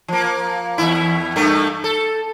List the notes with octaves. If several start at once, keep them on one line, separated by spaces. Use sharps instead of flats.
F3 A#3
E2 G#2 E4
G2 A3 A#3
A4